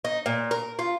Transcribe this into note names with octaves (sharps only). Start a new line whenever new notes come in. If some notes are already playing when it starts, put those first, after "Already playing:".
D#4
A#2
A#4
F4